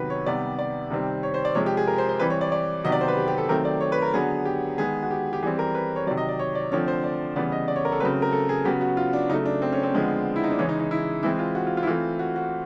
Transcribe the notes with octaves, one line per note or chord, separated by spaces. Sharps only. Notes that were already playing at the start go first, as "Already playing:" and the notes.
Already playing: C3 D#3 F#3 B3 B4
C#5
C3 D#3 G3 B3 D5
D5
C3 D#3 G3 C4
C#5
C5
D5
C3 F3 G#3 C#5
G4
G#4
A#4
C5
C5
E3 G3 C4 B4
C#5
D5
D5
C3 D#3 F#3 B3 D#5
D5
C5
B4
G4
G4
A4
D#3 F#3 A3 C4 A#4
D5
C#5
B4
A#4
D3 F#3 B3 G#4
G4
D#3 G#3 B3 G#4
F#4
G4
G4
E3 G3 C4 G#4
A#4
B4
C#5
C3 D#3 F#3 D5
D#5
D5
C#5
D5
D3 F3 A3 C4 C#5
C5
D5
C#3 E3 G3 B3 D5
D#5
D5
C#5
A#4
A4
C#3 F#3 A3 C4 B4
A#4
A4
G#4
C#3 F#3 B3 G4
F#4
F4
D4
C#3 F#3 A3 D#4
D4
C4
C#4
C4
D3 F3 G#3 B3
E4
D#4
D4
C#3 E3 G#3 C#4
D#4
D#4
E4
E3 G#3 C4 E4
F4
F#4
F4
F4
E4
E3 A3 C4 F4
F#4
F#4